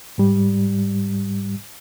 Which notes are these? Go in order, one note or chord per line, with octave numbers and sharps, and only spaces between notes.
G#2 G3